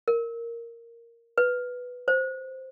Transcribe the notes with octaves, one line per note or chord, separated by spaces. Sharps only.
A#4
B4
C5